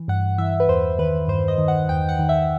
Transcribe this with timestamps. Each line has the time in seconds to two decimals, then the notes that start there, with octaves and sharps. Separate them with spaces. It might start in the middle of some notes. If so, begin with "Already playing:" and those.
Already playing: E3
0.08 G2 F#5
0.38 E3 E5
0.60 B4
0.68 E2 C5
0.99 D#3 B4
1.28 G2 C5
1.48 D#5
1.58 D#3
1.68 F#5
1.89 E2 G5
2.09 F#5
2.19 D#3
2.29 E5